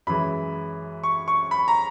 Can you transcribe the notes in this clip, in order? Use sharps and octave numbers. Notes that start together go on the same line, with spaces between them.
F#2 E3 G#3 B5
C#6
C#6
B5
A#5